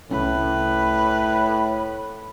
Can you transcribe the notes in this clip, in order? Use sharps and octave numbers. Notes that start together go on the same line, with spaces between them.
C2 A2 A3 C#4 B4